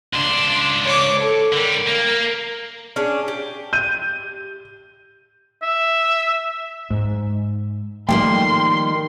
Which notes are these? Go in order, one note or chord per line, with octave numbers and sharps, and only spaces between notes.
C#2 D4 C6
C#5 D6
A4
D3 G3 A#4
A#3
C#4 D4 G#4
G4
G6 D#7
E5
G#2
D#3 F3 G3 A3 A#3 G5 C6